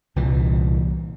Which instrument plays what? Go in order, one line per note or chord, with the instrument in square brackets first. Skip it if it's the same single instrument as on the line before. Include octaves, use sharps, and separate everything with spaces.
[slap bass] C2 A#2 E3